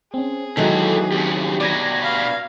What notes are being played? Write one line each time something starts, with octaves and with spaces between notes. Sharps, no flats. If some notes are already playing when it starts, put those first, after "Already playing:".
C4 C#4 G#4
D#2 D#3 E3 F#3 G#3 A4
F2 C#3 G4
B2 G3 D5 G#6 A#6
F5